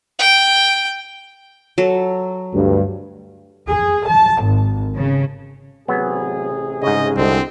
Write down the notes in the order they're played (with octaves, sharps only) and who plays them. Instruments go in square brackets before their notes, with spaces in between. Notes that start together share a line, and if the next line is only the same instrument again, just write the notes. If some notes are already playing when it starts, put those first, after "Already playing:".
[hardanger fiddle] G5
[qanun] F#3 A4
[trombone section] D2 G2
[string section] G#4
A5
G#1
C#3
[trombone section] A1 C3 G#4 [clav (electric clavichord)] F#3 B3
[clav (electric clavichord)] G#2 C#3 [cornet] D#5
[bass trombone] C2 [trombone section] D3 G#3 [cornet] C4